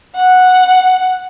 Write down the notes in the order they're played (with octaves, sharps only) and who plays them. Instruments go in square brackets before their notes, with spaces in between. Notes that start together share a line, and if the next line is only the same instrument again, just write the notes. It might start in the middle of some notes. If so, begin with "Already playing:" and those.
[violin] F#5